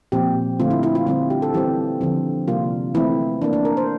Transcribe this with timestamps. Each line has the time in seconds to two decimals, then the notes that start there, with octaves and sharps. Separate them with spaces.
0.12 A#2 F3 C4 G4
0.60 D3 A3 C4 F4
0.71 E4
0.83 E4
0.95 F4
1.07 D3 G3 C4 F4
1.30 G4
1.42 A4
1.54 E3 G3 C4 G4
2.01 D3 F3 C4
2.48 C3 G3 A#3 F4
2.94 E3 A3 C4 E4
3.42 E3 A#3 D4
3.53 D4
3.65 A#4
3.77 C5